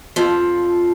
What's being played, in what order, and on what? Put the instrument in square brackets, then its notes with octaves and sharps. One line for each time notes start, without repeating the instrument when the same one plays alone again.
[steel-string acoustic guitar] F2 F3